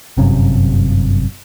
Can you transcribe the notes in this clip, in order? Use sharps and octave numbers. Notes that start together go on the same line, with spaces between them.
G1 F#2 C3 C#4